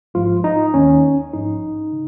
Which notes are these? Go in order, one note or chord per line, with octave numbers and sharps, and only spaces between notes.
G#1 G#2 F3 G#3 F4
D#4
D#2 D#3 A#3 C#4
A#1 G#2 F3 D#4
C#3